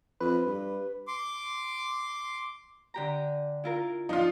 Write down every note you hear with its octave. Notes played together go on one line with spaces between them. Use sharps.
F2 B4
G2
C6 D6
D3 G4 A#5
E4 F4 A#4
F3 D4 D#4 F4